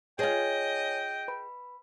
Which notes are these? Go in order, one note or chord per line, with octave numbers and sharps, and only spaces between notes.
F4 G#4 B4 C#5 D#5 G5 G#5
B4 B5